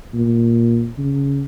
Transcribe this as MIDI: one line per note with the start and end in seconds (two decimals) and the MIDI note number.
0.14 0.89 46
0.98 1.45 49